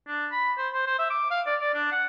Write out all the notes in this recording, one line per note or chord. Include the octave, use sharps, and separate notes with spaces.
D4
B5
C5
C5
C5
E5
D6
F5
D5
D5
D4
F#5